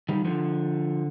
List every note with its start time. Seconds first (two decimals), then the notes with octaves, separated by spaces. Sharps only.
0.09 D#3 G3
0.25 D3 F3